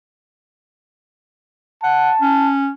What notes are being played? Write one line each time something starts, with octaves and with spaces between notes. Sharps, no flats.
F#5 A5
C#4